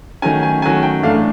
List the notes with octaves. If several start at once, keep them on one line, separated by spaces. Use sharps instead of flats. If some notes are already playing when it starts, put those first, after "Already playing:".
D#3 F#3 A3 C#4 G#5
G#5
D#3 F#3 A3 C#4 G#5
G5
A2 E3 A3 D4 F5